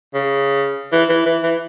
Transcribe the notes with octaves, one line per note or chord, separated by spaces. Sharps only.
C#3
E3
E3
E3
E3